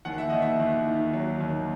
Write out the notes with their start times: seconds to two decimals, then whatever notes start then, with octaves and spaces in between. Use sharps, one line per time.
0.05 D#2 F#5
0.18 E5
0.30 D#2 D#5
0.42 E5
0.60 D#2
0.86 D#3
1.13 F#3
1.41 D#2